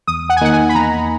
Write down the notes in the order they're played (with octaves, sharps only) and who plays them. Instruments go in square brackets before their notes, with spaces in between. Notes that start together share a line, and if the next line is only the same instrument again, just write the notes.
[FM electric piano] E2 [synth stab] D#6
[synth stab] F#5
G#5
[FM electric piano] D#3 A#3 D#4 [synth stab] F#5
[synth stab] G#5
B5
[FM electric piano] E2 [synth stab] A#5